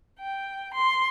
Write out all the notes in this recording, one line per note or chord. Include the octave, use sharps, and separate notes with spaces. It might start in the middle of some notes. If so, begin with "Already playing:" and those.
G5
C6